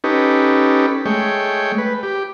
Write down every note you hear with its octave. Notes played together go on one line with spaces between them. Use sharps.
C#4 D#4 G4 A4 B4
G#3 A3 C#5 G5
B4
G4